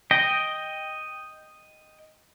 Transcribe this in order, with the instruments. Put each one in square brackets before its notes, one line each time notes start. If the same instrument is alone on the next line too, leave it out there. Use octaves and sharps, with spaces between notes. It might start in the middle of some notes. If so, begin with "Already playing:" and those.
[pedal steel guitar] D#5 G5